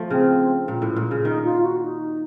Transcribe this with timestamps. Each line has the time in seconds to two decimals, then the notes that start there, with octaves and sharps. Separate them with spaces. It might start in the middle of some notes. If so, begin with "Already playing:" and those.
Already playing: F3 A3
0.10 C#3 C4
0.68 A#2
0.82 A2
0.96 A#2
1.11 C#3
1.25 D#3 D#4
1.44 F4
1.63 F#4
1.82 D#4